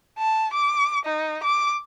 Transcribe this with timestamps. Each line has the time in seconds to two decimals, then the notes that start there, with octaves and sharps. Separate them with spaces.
0.19 A5
0.53 D6
1.05 D#4
1.43 D6